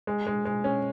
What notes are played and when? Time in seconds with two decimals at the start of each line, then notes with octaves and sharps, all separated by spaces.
0.07 G#3
0.27 G#3
0.45 G#3
0.64 C#4